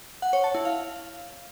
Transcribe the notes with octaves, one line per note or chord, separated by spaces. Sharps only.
F#5
C#5
A5
E4
F5